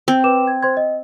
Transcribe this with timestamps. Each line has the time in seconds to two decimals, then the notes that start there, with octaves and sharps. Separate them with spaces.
0.08 C4
0.24 B4 D6 E7
0.48 G#6
0.63 C5 C6 G#6
0.77 D#5